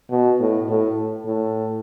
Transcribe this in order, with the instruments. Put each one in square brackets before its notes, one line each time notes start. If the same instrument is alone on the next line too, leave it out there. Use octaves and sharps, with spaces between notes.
[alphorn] B2
A2
A2
A2